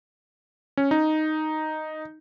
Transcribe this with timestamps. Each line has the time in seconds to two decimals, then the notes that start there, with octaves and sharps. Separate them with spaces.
0.77 C#4
0.91 D#4